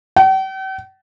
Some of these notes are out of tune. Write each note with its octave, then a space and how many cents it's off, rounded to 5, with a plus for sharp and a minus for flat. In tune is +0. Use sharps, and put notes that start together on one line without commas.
G5 -45